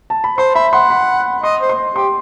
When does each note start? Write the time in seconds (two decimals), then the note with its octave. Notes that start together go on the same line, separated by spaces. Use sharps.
0.10 A5
0.24 B5
0.38 C5 C6
0.55 E5 B5
0.73 F#5 C6
0.90 B5
1.43 D#5 C6
1.61 C5
1.69 C6
1.96 G4 C6